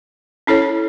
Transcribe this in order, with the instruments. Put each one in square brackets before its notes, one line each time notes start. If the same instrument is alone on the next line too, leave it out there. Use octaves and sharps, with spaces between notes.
[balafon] C#4 E4 A4 C#5